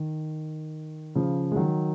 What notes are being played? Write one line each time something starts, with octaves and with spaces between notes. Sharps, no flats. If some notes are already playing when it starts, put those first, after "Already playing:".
Already playing: D#3
C#3 F3
G#3
D#3 F#3